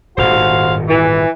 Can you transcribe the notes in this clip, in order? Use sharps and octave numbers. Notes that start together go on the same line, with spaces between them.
D#1 G#1 A2 F#4 C5 F5
E3